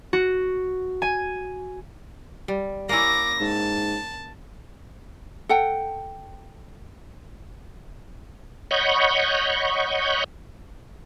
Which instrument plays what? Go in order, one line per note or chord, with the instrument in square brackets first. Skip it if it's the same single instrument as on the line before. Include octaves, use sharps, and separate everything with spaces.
[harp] F#4
G#5
[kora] G3
[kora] A#3 C#4 E4 [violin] D6 A#6
[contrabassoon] G#2 [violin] A5
[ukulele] A4 F#5 G5
[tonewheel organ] C#5 D#5 F#5 B5 C#6 G6